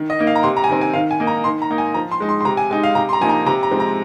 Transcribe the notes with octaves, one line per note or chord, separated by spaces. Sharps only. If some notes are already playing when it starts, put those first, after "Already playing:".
Already playing: D#3
D#5
A#3 D#4
F5
A#5
C3 C6
A#5
G#5
D#3 C4 A#5
G#5
D#3 F5
G#5
A#3 D#4
A#5
D#3 C6
A#5
A#3 D#4
G#5
F3 A#5
C6
G#3 D#4
C6
C6
C3 A#5
G#5
G#3 D#4 G#5
F5
C3 A#5
C6
A#5
F3 A#3 D#4 G#5
A#5
C3 A#5
A#5
F3 G#3 C4
A#5